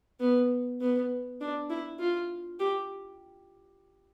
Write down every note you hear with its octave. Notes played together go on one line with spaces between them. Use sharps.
B3
B3
D4
E4
F4
G4